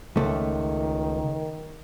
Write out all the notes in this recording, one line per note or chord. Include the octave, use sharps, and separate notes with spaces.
C#2 D#3 A3